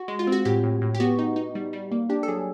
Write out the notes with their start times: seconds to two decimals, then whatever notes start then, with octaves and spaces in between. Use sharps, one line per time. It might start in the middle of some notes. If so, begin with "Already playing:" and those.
Already playing: F#4
0.08 G#3
0.19 F4
0.27 C4
0.32 F#4
0.45 A2 G4
0.63 A2
0.82 A2
0.95 G4
1.00 B3 F#4
1.19 D#4
1.36 D#4
1.55 G3
1.73 G3
1.91 A#3
2.10 D4 G4
2.23 A4
2.28 F#3 G#4